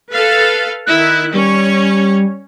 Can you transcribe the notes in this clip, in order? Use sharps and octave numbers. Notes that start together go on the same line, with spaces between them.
A4 B4 F5 A6
D#3 E4 F#6
G3 C#4 C#5